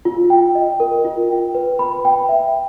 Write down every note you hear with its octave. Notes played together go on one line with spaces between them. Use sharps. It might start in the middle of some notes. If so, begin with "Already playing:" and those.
F4
G5
D#5
A#4
F4
G5
B4
B5
G5
E5